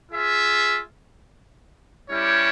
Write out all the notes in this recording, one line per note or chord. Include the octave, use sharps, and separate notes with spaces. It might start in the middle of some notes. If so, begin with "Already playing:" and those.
F4 G#4 E5
G3 C#4 E4 G4 C#5